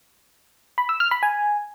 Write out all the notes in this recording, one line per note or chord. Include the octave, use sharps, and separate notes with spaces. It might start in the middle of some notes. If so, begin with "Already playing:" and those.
B5
E6
F6
B5
G#5